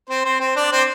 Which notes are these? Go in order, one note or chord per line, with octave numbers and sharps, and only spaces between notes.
C4 C5
C4 C5
C4 C5
D4 D5
C4 C5